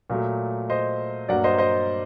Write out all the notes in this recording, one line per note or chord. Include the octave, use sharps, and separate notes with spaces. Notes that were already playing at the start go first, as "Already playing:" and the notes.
A#2 F#3 A3
C5 D#5
G2 F#3 A#3 D5 F#5
C5 D#5
C5 D#5